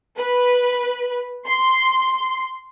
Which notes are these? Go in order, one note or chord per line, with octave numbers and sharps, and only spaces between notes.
B4
C6